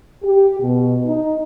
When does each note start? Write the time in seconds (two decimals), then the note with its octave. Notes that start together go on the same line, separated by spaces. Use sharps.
0.24 G4
0.61 B2
1.06 D#4